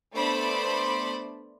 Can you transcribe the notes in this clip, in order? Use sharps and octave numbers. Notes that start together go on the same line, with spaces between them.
A3 B3 D4 C5 B5 D6